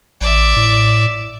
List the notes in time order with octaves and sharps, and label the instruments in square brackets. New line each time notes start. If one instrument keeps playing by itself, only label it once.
[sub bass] A1 [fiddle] D5 E5
[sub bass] A2